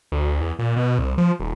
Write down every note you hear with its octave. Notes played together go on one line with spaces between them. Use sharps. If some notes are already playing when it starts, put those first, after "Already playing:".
D2
E2
A#2
B2
C2
F3
D#1